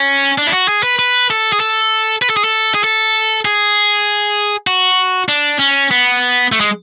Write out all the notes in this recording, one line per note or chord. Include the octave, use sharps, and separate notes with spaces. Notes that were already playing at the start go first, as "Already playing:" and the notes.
Already playing: C#4
D4
E4
F#4
G#4
B4
B4
A4
G#4
A4
B4
A4
G#4
A4
G#4
A4
G#4
F#4
D4
C#4
B3
A3
G#3